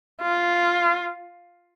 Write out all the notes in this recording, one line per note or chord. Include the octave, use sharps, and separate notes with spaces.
F4